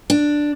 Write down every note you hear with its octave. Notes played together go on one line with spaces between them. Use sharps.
D4